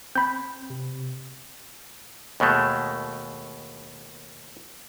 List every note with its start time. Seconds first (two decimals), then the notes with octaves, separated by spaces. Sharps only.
0.16 C4 B5 G6
0.70 C3
2.40 D#2 B2 G#3 A3